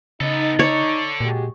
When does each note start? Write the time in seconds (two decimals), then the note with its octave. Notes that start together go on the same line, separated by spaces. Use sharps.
0.21 C#3 B3 D#4 A4
0.59 A4 C#5 D5
1.21 A#2 G#3 F#4 G4